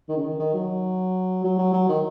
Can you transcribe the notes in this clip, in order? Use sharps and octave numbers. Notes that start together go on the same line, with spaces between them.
D#3
C#3
D#3
D#3
F#3
F#3
F#3
F#3
D#3